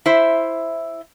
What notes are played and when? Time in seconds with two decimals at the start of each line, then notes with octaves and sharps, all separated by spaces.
0.06 E4 C5 E5